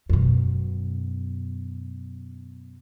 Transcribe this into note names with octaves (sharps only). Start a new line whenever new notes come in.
F#2 B2